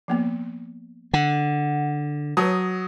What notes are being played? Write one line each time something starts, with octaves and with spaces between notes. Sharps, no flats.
F3 A#3 B3
D3 F#5
F#3 B4 C#5 A5 D#6